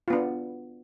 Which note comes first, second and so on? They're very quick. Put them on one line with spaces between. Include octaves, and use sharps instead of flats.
F4 B3 D4